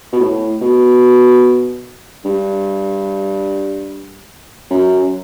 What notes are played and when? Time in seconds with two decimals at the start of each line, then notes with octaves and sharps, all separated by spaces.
0.13 B2
0.20 A2
0.61 B2
2.25 G2
4.71 F#2